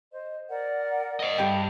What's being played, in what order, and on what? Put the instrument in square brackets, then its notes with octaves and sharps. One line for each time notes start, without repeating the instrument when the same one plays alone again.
[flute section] C5 D#5
A#4 D5 F#5
[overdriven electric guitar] C5 D#5
[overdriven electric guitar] G2 [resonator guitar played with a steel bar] G4 G5 [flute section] A4